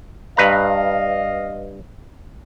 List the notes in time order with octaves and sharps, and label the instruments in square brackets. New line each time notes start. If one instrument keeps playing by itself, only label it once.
[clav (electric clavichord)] G2 B4 A#5 [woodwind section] D#5 F5